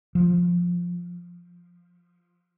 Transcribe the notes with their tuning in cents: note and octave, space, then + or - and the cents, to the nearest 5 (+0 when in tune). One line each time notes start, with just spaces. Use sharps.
F3 +5